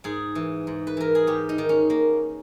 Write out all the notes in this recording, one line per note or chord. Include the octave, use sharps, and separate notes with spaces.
G#2 G#4
E3
G#2
B4
E3 A#4
G#4
G#2 G4
D#4
D#3
C#4
A#3